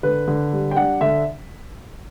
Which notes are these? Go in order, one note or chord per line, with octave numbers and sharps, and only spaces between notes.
D3 B4
D3
G3
G5
D4 F#5
D3 E5